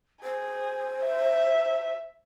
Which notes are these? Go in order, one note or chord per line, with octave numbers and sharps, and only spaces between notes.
G#4 C5
E5